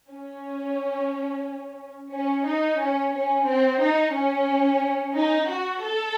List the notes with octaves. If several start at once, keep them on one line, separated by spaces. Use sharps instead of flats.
C#4
C#4
D#4
C#4
C#4
C4
D#4
C#4
D#4
F#4
A4